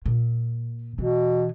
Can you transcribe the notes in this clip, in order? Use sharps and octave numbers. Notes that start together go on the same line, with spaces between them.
A#2
B2 E3